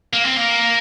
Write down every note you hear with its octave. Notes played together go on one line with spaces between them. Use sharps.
A#3
C4
A#3